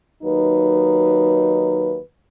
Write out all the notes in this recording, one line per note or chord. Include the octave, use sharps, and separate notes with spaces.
D#2 F#3 D#4 B4